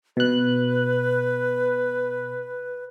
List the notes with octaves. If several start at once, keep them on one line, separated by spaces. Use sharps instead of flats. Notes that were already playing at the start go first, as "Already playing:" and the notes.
B2 B4 F#6